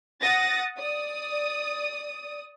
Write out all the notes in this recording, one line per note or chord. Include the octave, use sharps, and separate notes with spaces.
F#5 D#6 A6 A#6
D5 D#6